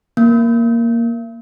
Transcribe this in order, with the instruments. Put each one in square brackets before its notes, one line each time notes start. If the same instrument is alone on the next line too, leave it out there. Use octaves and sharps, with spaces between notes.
[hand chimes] A#3